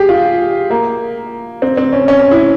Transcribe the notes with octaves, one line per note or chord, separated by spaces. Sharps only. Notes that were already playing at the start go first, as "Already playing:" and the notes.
Already playing: G4 G#4
F4
A#3
C4
C4
C#4
C#4
C#4
E4